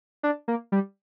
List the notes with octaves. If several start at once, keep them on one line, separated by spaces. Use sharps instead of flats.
D4
A#3
G3